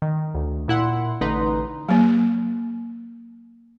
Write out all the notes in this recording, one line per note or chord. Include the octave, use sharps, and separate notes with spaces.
D#3
D2
A#2 E4 F#5 C6
A1 D3 D#4 B4 A#5 C6
F#3 A#3